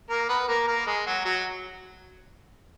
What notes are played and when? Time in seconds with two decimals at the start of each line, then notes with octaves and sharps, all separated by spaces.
0.10 A#3 A#4
0.29 B3 B4
0.48 A#3 A#4
0.67 A#3 A#4
0.86 G#3 G#4
1.06 F#3 F#4
1.25 F#3 F#4